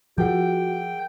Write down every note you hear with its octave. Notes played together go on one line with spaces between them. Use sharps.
F3 F#4 G#4 A#4 F#5 G5